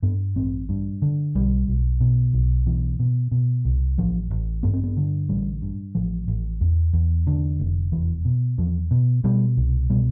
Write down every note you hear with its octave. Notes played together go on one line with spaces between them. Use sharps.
G2 B3
A1 C4
G2
D3
B1 G3
B1
B2
B1
B2 E3
B2
B2
C2
A1 F3
A1
G2 B3
C4
B3
D3
A1 G3
G2
A1 F3
A1
E2
E2
D3
F1
E2 E3
B2
E2 F3
B2
B2 G3
C2
B2 G3